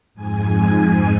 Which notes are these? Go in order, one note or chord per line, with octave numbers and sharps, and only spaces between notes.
F2 G#2 G#5